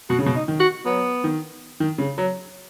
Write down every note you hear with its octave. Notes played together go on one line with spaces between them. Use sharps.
B2 F#4
C#3
B2
D#4
D#3
F#4
F#3 B3
D#3
D#3
C#3
F#3